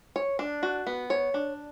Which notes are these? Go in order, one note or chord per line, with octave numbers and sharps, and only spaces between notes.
C#5
D4
F#4
B3
C#5
D4